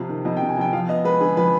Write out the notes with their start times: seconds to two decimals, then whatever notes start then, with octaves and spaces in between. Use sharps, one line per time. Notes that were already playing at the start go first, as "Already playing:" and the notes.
Already playing: F2 C3 C4
0.09 D#3
0.25 F2 D#5
0.37 G5
0.42 C3
0.49 G#5
0.57 F2 G5
0.73 F3 F5
0.88 B3 D#5
1.04 G#3 B4
1.20 D3 G#4
1.37 F3 B4